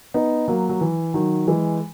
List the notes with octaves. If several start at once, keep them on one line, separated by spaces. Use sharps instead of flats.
B3 D#4
F#3 A#3
F#3
E3
D#3 F#3
E3 G#3